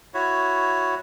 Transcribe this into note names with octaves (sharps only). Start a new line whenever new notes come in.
E4 F#4 C#5